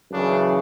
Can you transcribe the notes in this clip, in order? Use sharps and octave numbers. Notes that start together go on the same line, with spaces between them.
F#2 C#3 E3 D4